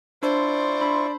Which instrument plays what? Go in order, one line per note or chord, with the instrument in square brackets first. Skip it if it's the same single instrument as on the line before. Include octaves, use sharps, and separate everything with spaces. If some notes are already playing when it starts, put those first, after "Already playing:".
[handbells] D4 [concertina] E4 F4 C#6 [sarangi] C5 [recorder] D5
[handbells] D4 B5 C6